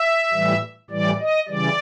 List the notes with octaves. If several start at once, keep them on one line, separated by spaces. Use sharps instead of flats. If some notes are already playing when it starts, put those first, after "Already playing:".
Already playing: E5
A2 E3 G3
A2 E3 G3 D5
D#5
C#3 E3 G3 D5